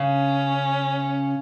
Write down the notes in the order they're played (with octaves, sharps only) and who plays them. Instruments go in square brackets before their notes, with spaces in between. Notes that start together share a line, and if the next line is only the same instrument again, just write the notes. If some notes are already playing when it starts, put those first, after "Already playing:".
Already playing: [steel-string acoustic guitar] C#3 [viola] C#4